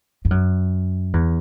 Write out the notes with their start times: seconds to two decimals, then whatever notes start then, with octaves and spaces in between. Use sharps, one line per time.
0.25 G2
0.31 F#2
1.13 E2